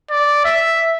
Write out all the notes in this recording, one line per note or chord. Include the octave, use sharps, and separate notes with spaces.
D5
E5